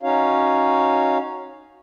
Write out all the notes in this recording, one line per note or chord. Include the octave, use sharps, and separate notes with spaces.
C#4 D#4 F#4 C#5 F5